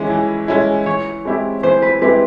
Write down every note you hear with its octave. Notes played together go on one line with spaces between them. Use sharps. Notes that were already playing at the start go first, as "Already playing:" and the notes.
Already playing: E3 G#3 C#4 E4 D5
E3
G#3 C#4 E4
E3 C#5
G#3 C4 E4 G4
E3 C5
B4
G#3 C4 E4 G4 B4